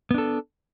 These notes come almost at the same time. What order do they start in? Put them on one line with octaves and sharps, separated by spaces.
B3 D4 A4